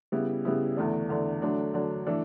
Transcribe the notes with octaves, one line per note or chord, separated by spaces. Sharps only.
C#3 G3 B3 E4
C#3 G3 B3 E4
E2 D3 A3 D4
E2 D3 A3 D4
D3 F#3 A3 D4
D3 F#3 A3 D4
E3 A3 D4 A4